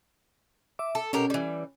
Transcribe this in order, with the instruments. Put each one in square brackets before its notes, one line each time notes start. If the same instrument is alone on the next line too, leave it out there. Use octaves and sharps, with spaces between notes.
[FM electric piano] E5 D6
[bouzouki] A4
[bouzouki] B2 G4 A#4 [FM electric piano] C#4
[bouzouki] E3 G3